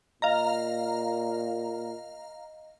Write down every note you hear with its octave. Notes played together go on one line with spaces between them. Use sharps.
A#2 D#5 F5 A#5